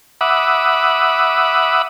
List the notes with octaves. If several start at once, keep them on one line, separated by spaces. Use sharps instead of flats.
E5 F#5 B5 D6 D#6